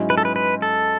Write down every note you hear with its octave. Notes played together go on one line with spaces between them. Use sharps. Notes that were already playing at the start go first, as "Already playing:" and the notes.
Already playing: G#2 F#3 C#4 E4
B4
A4
B4
B4
A4